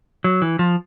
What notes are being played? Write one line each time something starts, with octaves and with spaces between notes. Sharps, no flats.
F#3
E3
F3